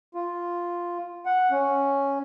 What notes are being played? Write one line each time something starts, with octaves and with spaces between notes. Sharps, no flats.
F4
F#5
C#4